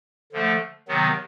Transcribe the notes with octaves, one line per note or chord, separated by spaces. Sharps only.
D3 F3 A3
C3 D#3 F#3 B3